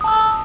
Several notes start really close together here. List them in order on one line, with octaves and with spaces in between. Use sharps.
D#6 A5 E6